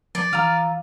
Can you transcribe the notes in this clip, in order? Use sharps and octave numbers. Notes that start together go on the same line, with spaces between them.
F3 D5
E3 F4 A#5 E6 F6